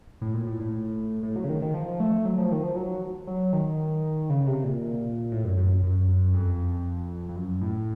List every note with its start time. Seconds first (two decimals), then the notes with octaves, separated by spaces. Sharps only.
0.21 A2
0.34 A#2
0.47 A2
0.60 A2
1.23 A2
1.36 F#3
1.44 C#3
1.49 D#3
1.62 D#3
1.74 F3
2.00 A3
2.25 F#3
2.38 F3
2.51 D#3
2.63 F3
2.76 F#3
3.27 F#3
3.53 D#3
4.30 C#3
4.47 C3
4.64 A#2
5.32 A2
5.44 F#2
5.57 F#2
5.83 F#2
6.08 F#2
6.34 F2
7.29 F2
7.36 F#2
7.61 A2